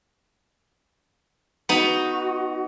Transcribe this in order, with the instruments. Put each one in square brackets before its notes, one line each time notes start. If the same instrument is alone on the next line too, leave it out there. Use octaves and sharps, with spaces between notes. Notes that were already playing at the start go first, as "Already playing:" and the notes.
[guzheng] B3 D#4 [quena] F#4